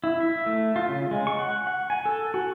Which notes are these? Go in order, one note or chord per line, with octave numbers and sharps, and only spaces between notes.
E4
E5
A3
F4
C#3
G#3
C#6
F#5
F#5
G#5
A4
F#4